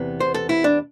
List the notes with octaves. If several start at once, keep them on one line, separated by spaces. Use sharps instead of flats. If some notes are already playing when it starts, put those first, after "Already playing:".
Already playing: E2 C3 E3 B3
C5
A4
E4
D4